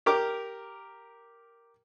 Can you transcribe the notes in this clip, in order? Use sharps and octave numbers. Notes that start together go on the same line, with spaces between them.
G4 A#4 D6